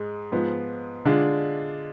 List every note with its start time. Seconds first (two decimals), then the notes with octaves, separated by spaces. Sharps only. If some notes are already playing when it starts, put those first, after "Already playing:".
Already playing: G#2 G#3
0.32 G#2 F3 B3
1.05 D3 G#3 D4 F4